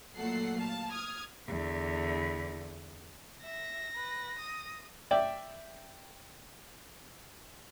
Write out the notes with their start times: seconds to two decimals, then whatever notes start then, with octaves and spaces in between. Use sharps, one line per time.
0.16 A#2 F#3 A3 A4 F#5 C7
0.58 F5 A5
0.91 D#6 F6 G#6
1.47 E2 D3
3.44 E5 A#6
3.95 B4
4.39 D#6
5.11 D5 E5 G5